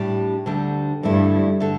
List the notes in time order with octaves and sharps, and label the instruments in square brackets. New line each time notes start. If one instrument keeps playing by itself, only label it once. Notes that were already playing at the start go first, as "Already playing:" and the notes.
Already playing: [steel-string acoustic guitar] A2 G3 D4 G4
D2 D3 G3
[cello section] G2 [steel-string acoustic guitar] D3 A3 E4
[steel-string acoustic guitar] D3 A3